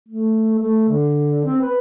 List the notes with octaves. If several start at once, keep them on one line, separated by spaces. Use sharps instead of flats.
A3
A3
D3
C4
B4